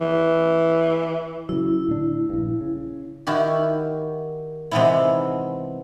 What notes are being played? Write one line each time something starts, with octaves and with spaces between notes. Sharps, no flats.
E3
C#3 F#3 E4
A2 D3 D4
A#1 G2
C#3
D#3 E4 F#4 G4
C3 E3 G#3 B3 D#4 E4